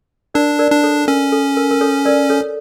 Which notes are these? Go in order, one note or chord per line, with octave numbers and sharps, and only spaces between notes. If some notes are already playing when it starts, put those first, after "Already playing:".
D4 A#4 D5
A#4 D5
D4
A4 C#5
C#4 A#4
A4
A#4
A#4
A4 C#5
A#4 D5
A4 C#5